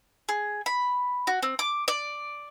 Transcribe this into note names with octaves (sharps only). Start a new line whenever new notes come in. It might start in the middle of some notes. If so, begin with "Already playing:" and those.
G#4
B5
F#4
C4
D6
D5